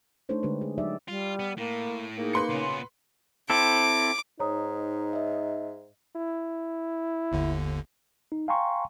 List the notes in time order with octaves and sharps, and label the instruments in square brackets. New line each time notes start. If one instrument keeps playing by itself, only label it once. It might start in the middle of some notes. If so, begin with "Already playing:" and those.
[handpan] A3 D4 D#4 A4 C5 C#5
D3 G#3 D4 G4 B4
G#4
F#3 D#4 G4 D5 E5
[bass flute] G3 [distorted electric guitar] F4
[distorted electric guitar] B3
[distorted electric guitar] A2 [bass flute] A#3
[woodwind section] A#3 D#4 [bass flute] G#4
[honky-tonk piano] B4 C6 C#7
[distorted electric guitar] A#2 B3 [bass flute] C#3
[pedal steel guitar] C4 E4 A4 [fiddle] D6
[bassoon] G#2 [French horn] D#4 [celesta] C#5 A#5 D#6
[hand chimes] D#5 E5
[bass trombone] E4
[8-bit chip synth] G1 D#2 D3
[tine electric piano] D#4
F5 G5 G#5 A#5 C6 C#6